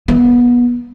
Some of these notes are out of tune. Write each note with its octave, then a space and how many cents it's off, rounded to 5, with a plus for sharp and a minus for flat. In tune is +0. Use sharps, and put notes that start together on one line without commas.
B3 -25